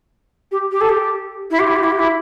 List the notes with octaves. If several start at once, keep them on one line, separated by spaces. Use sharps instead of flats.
G4
G4
A4
G4
E4
G4
E4
G4
E4
G4
E4